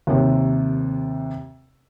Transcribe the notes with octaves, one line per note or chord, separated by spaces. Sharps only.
D#2 C3